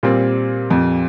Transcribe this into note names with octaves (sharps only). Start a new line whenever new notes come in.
A#2 G3 C4
F2